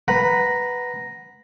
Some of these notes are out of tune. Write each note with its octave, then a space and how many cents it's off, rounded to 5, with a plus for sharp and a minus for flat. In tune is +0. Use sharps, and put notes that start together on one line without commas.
B4 +0 F#5 +0 A#5 +0